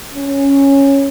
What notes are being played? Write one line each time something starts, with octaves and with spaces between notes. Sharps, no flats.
C#4